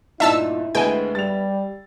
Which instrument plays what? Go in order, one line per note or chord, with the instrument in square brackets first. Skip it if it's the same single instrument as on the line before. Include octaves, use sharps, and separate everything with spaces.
[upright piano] G1 A#2 D5 [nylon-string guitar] D#4 [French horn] E4 [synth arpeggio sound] E5 A5 E6
[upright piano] D2 G#3 D#5 [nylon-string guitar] B3 B4 E5 [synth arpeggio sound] G5 G#5
[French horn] G3 [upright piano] A6 F7